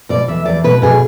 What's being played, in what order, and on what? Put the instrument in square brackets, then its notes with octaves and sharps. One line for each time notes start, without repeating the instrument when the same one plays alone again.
[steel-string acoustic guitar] B2 D5
E2 E5
E2 D5
B2 B4
B2 G#4